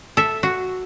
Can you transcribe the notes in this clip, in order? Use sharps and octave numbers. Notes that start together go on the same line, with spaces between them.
A4 E5
F#4